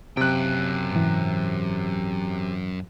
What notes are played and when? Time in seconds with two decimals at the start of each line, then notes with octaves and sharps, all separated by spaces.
0.17 F#2 C3 G5 F#6
0.93 G#2 E3